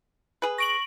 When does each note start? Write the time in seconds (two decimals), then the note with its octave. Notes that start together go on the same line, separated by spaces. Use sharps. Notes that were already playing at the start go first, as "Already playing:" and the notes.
0.42 G#4 B4
0.58 C#6 A#6 D7 F#7